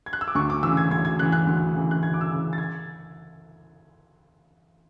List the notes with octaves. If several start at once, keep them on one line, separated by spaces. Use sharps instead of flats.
G#6
F#6
E6
D6
D2 C#6
D6
C#3 E3 E6
G#6
D2 G#6
G#6
C#3 E3 F#6
F#6
D2
C#3 E3
F#6
D2 G#6
D6
E6
C#3 E3
A6
G#6